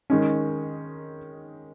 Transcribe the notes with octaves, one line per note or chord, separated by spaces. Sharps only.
D#3 G#3 C#4